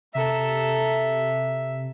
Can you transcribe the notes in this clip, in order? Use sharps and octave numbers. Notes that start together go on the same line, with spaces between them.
C3 A4 E5 A#5